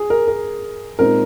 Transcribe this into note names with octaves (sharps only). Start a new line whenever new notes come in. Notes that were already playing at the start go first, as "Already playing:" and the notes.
Already playing: G#4
A#4
A#4
A#2 G#3 C4 D#4 A#4